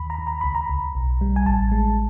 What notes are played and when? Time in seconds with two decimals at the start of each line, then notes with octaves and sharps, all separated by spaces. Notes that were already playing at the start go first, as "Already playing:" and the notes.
Already playing: D#2 B5
0.10 A#5
0.19 D#2
0.27 A#5
0.41 C#2 B5
0.55 A#5
0.70 C#2
0.95 B1
1.21 G3
1.36 G#5
1.46 A1 A5
1.72 G#3